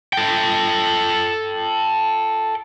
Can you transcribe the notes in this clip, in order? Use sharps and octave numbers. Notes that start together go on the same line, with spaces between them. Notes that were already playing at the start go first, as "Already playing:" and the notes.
A4 G5